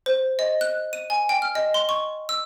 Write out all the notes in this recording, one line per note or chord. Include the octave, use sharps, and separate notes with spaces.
C5
D#5
F#6
D#7
G#5
G5
F6
D#5
C6
C#6
E6